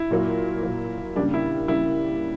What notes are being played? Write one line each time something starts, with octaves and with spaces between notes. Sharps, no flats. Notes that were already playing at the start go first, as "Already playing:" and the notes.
Already playing: E4
A#2 F#3 A#3
A#2 F#3 A#3
C#3 G3 A#3 D4
E4
C#3 G3 A#3 E4